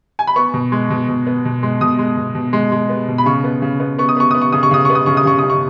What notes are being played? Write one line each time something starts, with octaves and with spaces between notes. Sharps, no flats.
G#5
B5
B3 C#6
B2
G#3
B2
B2
B3
B2
G#3
B2 D#6
G#3
B2
B2
G#3
G#3
B3
B2
B5
C#3 C#6
B3
C#3
B3
B3 C#6
D#6
B3 C#6
B3 D#6
C#6
C#3 D#6
C#6
C#3 D#6
B3 C#6
D#6
C#3 C#6
D#6
C#3 C#6
C#3 D#6
C#6